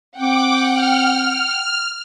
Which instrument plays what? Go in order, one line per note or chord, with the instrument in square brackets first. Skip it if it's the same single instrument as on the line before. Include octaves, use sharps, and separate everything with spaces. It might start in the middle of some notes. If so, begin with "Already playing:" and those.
[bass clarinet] C4 [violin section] F#5 G5 [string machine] D6
[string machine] F6